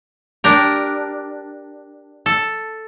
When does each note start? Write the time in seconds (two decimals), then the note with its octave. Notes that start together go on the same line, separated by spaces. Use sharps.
0.44 D4 G4 A#4
2.26 A4